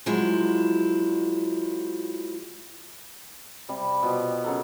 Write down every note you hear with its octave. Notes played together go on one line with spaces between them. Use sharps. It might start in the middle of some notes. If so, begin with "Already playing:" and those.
F3 F#3 G#3 E4
C3 G3
B2 F3 G4
C#3 F#3 A4 A#4